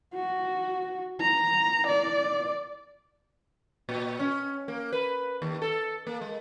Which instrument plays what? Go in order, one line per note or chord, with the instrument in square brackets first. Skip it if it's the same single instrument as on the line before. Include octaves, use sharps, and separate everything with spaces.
[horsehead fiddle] F#4
A#5
D5
[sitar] A#2
C#4
A#3
B4
D#2
A4
A#3
G#3